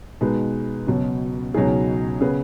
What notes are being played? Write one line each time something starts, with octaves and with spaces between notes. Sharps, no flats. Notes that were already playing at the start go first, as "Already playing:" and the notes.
B2 G#3 D#4 B4
C#2 B2 F#3
C#2 B2 F#3 D#4 G#4
C#3 B3 G#4 B4